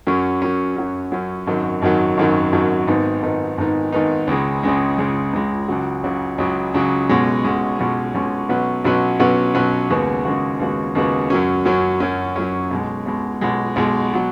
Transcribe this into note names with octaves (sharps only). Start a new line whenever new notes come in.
F#2 F#3 C#4
F#2 F#3 C#4
F#2 F#3 C#4
F#2 F#3 C#4
G#1 F#2 D#3 F#3
G#1 F#2 D#3 F#3
G#1 F#2 D#3 F#3
G#1 F#2 D#3 F#3
G#1 G#2 D#3 B3 D#4
G#1 G#2 D#3 B3 D#4
G#1 G#2 D#3 B3 D#4
G#1 G#2 D#3 B3 D#4
C#2 C#3 G#3
C#2 C#3 G#3
C#2 C#3 G#3
C#2 C#3 G#3
C#2 C#3 F#3
C#2 C#3 F#3
C#2 C#3 F#3
C#2 C#3 F#3
B1 B2 G#3 C#4
B1 B2 G#3 C#4
B1 B2 G#3 C#4
B1 B2 G#3 C#4
B1 B2 F#3 C#4 B4
B1 B2 F#3 C#4 B4
B1 B2 F#3 C#4 B4
B1 B2 F#3 C#4 B4
D#2 C#3 G#3 B3 F#4
D#2 C#3 G#3 B3 F#4
D#2 C#3 G#3 B3 F#4
D#2 C#3 G#3 B3 F#4
F#2 F#3 C#4
F#2 F#3 C#4
F#2 F#3 C#4
F#2 F#3 C#4
B1 B2 G#3
B1 B2 G#3
B1 B2 G#3
B1 B2 G#3
B2 F#3